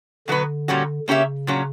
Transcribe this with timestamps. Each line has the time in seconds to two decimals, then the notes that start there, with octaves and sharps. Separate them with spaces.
0.28 B2 D3 F#3 B3 F#4 B4
0.68 A#2 G3 C#4 F#4
1.08 C#3 A#3 C#4 G4 C#5 E5
1.47 A#2 F#3 C#4